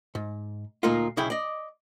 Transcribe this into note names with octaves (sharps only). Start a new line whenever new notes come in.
G#2
D2 A#2 A#3 D#4 F4
B1 C#3 E4 G#4 G5
D5 D#5